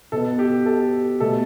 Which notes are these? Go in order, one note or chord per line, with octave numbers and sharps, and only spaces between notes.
B2 B3 A4
G4
A4
B2 A3 A4